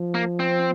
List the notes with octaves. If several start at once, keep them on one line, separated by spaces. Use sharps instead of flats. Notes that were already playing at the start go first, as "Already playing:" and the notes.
Already playing: F3
A#3
C4